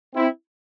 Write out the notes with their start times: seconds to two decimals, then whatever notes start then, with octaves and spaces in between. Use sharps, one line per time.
0.15 C4 E4